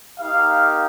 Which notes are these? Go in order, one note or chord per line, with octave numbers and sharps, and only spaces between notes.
A#3 D#4 G4 F5